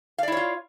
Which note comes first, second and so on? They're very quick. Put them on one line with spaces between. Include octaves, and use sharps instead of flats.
F5 D5 E4 C#5 F4